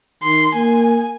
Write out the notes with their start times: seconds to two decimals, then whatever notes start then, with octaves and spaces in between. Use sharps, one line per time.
0.23 D#3 C6
0.55 A#3 G#5